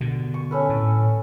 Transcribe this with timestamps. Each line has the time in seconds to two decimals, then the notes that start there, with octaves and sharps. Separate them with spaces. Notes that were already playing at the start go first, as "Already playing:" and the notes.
0.01 B2 D3
0.34 C#6
0.51 C#4 A4 B4
0.69 A2